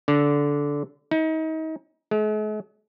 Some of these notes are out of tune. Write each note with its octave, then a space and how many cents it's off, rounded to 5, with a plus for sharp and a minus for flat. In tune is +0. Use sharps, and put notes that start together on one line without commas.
D3 -15
D#4 +35
G#3 +45